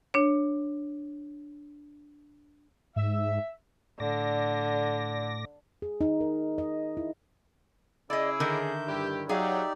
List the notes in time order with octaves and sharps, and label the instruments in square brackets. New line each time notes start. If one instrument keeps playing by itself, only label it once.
[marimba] D4 C#5
[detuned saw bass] G#2 [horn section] E5
[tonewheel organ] A2 D5 A#6 [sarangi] D3
[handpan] G#4
D#4
A#4
D#5
E4
[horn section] C#3 C#4 G#4 [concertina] E4 D6 E6 [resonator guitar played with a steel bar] D5 D#5
[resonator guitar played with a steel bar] D3 D#3 A#4 [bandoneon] E5 G6
[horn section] G2 G4 [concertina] D4 E4
[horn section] F#3 [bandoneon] D#4 G4 D5 [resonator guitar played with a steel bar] G#4 F5 [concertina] E5